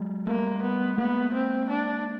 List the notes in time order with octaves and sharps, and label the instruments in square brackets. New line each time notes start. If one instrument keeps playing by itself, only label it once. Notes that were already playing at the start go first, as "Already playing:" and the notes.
Already playing: [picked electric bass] F#3 G#3
[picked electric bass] G3 A3 [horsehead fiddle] A#3
[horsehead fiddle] B3
[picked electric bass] G#3 A#3 [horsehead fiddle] B3
[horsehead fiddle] C4
D4